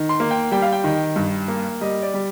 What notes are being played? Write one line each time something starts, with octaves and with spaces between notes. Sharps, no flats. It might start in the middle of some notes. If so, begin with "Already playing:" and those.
Already playing: D#3
C6
A#3
G5
G3 G5
F5
G5
D#3
G2
A#3
G3 D#5
D5
G3